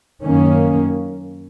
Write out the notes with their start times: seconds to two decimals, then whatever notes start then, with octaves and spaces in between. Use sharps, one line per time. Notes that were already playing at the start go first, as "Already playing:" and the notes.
0.23 F#2 D#3 A#3 C#4